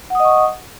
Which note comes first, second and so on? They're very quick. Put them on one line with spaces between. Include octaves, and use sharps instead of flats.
F#5 D#6 D#5 C#6